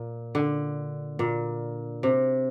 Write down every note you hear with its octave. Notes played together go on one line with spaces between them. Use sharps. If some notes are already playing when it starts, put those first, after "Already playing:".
Already playing: A#2
D3
A#2
C3